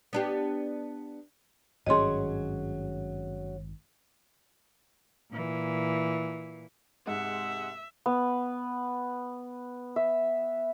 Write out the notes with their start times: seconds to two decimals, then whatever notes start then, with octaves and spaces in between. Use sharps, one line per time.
0.13 B3 D4 G4
1.86 G#1 G2 F#3 C#4 G#4 D#5 C6
5.31 A#2 E3
7.07 G#2 C3 G#3 E5 F#5
8.06 B3
9.96 E5